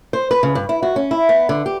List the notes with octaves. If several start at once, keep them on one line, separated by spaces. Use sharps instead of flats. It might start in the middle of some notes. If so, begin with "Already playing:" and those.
C5
B4
C#3
G2
E4
F#4
C#4
E4
B3
D3
G4